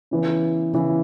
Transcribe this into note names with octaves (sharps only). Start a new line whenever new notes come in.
C#3 E3 B3
C#3 E3 B3